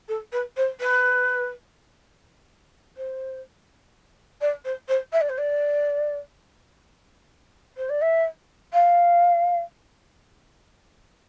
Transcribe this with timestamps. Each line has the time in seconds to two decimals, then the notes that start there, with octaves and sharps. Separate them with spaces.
0.08 A4
0.32 B4
0.57 C5
0.80 B4
2.97 C5
4.41 D5
4.65 C5
4.88 C5
5.13 E5
5.21 D5
5.29 C5
5.38 D5
7.77 C5
7.89 D5
8.01 E5
8.73 F5